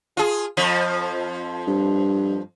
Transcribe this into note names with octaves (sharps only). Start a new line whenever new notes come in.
F4 G#4
F2 F3
G2